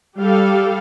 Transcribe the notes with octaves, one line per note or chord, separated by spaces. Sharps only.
G3 G4 A4 F5